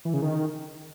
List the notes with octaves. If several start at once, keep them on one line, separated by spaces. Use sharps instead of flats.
E3
C#3
D#3